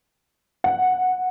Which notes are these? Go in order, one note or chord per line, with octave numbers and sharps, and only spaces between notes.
F#5